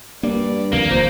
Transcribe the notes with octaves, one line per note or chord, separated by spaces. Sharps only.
G2 A#3 D5
D#2 C3 F3 A#3
F1 A#2 C5